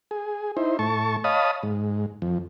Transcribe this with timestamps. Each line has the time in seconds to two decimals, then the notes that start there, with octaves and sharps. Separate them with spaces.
0.11 G#4
0.57 D#4 E4 C5
0.79 A2 A5 C#6
1.24 C#5 D#5 F5 A5 B5 D#6
1.63 G#2
2.22 F2